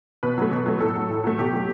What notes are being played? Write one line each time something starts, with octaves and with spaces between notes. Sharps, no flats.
B2 B4
F#3 A3
B2
F#3 A3
A2 A4
F#3 A3
A2
F#3 A3
B2 G4
F#3 A3